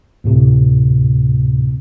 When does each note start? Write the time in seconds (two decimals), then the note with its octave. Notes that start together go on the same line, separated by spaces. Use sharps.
0.24 D2 A2 C3